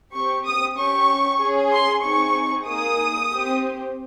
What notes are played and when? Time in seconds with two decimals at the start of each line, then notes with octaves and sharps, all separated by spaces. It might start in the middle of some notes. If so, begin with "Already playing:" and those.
0.14 C4 G4 C#6
0.45 D#6
0.77 C#4 G4 C#6
1.40 C#4 G#4
1.72 C6
2.03 C4 D#4 G#4 C#6
2.67 A#3 D#4 G#4 D#6
3.30 C4 G4